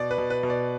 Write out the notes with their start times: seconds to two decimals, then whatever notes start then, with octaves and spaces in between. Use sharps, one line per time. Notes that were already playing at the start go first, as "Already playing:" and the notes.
Already playing: B2 D5
0.11 B4
0.18 B2
0.30 B4
0.43 B2
0.50 D5